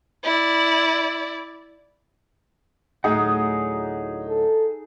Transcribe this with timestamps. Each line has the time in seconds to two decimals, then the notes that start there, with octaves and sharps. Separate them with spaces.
0.24 E4 D5
3.04 D2 A2 F#3 D#4 G#4 F#5 D#6
4.28 A4